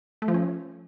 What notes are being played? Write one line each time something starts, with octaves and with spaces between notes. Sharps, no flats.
A3
F3
C#4